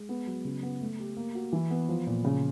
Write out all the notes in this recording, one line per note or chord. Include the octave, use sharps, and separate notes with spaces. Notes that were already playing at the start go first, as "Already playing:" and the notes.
Already playing: G#3
B3
F#3
C#3
B3
A3
G4
A#3
F#4
E3
B3
F3
A#2
C#3